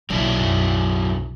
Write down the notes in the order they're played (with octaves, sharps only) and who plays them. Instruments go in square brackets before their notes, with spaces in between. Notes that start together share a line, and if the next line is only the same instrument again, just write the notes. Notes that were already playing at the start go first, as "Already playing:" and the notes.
[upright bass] B1 [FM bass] A#2 [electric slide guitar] F#3 D4 E4
[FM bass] F#2